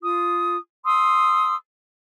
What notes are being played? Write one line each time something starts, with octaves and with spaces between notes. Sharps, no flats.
F4 D#6
C6 D#6 E6